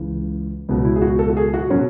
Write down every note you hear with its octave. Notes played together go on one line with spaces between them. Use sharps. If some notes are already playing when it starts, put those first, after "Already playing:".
Already playing: C#2 C#3 E3
C#2 B2 F#3 B3
E4
G#4
F#4
A4
F#4
G#4
F#4
B2 F#3 C#4